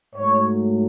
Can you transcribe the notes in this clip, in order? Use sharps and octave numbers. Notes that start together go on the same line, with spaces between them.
G#2 F#3 A3 C#5